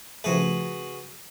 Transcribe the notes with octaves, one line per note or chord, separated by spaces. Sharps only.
C#3 F3 A3 F#4 G#4 B4